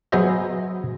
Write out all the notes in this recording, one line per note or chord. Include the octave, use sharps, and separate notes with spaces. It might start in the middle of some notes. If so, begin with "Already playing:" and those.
F#3 B3 G#4 C5 D#5 E5